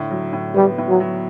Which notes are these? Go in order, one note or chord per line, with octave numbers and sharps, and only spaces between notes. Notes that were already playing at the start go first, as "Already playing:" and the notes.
Already playing: A2 D3
F#3
A2
G3 B3
A2
F#3
F#3